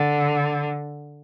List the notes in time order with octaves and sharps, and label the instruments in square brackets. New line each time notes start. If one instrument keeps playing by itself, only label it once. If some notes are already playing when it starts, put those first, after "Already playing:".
Already playing: [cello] D3